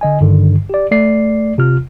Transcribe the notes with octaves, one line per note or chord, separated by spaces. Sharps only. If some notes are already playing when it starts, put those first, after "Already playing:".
D3 D#5 G#5
G2 D3 D#3
G4 D5
A3 D5 C7
C3 F4 F6